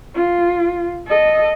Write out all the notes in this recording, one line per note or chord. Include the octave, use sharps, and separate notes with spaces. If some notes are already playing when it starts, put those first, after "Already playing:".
F4
A4 D#5